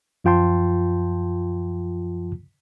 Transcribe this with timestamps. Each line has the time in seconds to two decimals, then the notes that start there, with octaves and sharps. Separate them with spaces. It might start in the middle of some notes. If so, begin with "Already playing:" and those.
0.24 F#2 F3 F4 G5 A5 C6